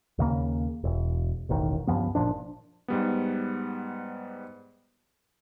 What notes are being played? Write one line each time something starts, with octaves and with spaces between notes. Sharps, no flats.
D#2 C#3 A#3
E1
E1 A1 D#3
C#2 G2 F3 B3
G1 A#2 F3 D4
G#2 G3 B3